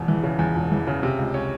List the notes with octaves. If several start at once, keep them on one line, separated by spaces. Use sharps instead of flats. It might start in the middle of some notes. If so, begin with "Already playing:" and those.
Already playing: E1 E2
E3
C#3
E2
E1
E3
C#3
C3
C#2
C#4